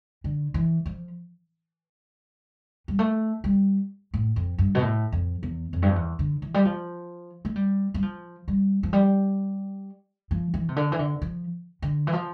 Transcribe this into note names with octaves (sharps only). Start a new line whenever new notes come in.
D3
E3
F3
G3
A3
G3
A2
F2
G2
B2
A2
F2
E2
F2
G2
F2
E2
D3
E3
G3
F3
A3
G3
G3
F3
G3
F3
G3
F3
E3
C3
D3
E3
D3
F3
D3
E3
F3